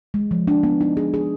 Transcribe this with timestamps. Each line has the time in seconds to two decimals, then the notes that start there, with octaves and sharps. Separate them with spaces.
0.14 G#3
0.31 F3
0.47 D4
0.64 B3
0.81 D#4
0.97 G#4
1.14 G#4